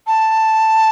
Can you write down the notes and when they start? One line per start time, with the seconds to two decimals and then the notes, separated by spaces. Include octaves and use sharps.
0.07 A5